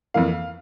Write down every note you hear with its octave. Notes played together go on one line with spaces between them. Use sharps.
F2 E3 A#3 F5